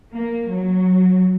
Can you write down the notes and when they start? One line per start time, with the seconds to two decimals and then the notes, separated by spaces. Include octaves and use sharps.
0.14 A#3
0.50 F#3